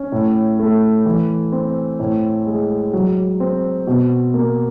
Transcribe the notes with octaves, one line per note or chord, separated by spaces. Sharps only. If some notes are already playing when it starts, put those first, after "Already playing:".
Already playing: C#4
A2
A3
E3
C4
A2
G#3
F#3
C4
B2
A#3